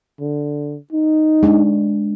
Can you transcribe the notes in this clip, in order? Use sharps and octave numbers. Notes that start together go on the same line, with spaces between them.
D3
D#4
G#3 D4